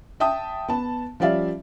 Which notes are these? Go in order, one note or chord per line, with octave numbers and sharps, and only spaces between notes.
E5 G5 A5 D#6
B3 A5
F3 G3 C#4 D5 E5 F5